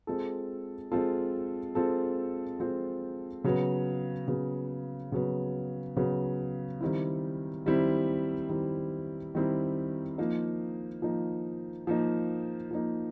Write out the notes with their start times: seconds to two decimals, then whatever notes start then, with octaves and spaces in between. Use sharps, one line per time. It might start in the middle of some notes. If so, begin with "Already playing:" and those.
0.07 G#3 C4 F4 A4
0.92 G#3 C4 F4 A4
1.75 G#3 C4 F4 A4
2.60 G#3 C4 F4 A4
3.44 C#3 F#3 B3
4.28 C#3 F#3 B3
5.12 C#3 F#3 B3
5.97 C#3 F#3 B3
6.81 D#3 G3 C4 E4
7.66 D#3 G3 C4 E4
8.49 D#3 G3 C4 E4
9.35 D#3 G3 C4 E4
10.18 F3 A#3 D#4
11.02 F3 A#3 D#4
11.87 F3 A#3 D#4
12.71 F3 A#3 D#4